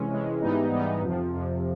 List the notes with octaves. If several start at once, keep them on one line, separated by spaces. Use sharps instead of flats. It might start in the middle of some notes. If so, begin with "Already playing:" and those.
Already playing: C3 E3 G#3 C#4
C3 E3 G#3 C#4
G#2 E3 G3 B3 D#4
G#2 E3 G3 B3 D#4
F2 C3 F3
F2 C3 F3